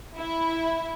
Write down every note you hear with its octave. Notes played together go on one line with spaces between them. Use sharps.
E4